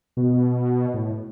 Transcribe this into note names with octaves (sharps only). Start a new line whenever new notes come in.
B2
A2